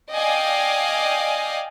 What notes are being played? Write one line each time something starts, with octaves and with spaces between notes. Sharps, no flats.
D5 D#5 F5 G5 G#5